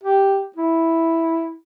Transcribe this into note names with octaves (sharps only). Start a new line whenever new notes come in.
G4
E4